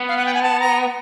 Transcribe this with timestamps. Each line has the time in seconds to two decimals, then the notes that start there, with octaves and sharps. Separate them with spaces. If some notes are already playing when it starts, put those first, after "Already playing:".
Already playing: B3
0.09 F5
0.17 F#5
0.26 G5
0.34 G#5
0.42 A5
0.60 A#5